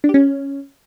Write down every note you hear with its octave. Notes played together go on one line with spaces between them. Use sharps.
D4
G4
C#4